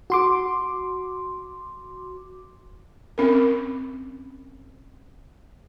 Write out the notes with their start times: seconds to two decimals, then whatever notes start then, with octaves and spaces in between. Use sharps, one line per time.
0.10 F#4 C6 D6
3.18 C4 C#4 A#4